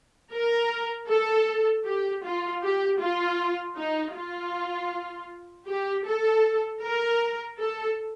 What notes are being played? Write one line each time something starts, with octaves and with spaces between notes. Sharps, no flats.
A#4
A4
G4
F4
G4
F4
D#4
F4
G4
A4
A#4
A4